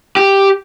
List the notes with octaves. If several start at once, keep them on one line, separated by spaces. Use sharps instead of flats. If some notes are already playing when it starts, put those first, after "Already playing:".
G4